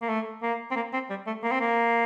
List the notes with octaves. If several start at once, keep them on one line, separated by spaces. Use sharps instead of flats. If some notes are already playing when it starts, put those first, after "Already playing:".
A#3
A3
A#3
C4
A#3
C4
G3
A3
A#3
C4
A#3